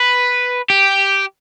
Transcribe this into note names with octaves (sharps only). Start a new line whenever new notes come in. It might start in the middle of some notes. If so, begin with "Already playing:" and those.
Already playing: B4
G4